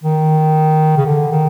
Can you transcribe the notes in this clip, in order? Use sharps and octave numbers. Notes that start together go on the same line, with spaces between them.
D#3
C#3
D3
D#3